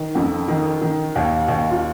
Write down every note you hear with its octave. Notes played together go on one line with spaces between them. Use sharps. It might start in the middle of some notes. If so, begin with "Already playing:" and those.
Already playing: D#3
F2
D#3
D#3
D#2
D#2
F4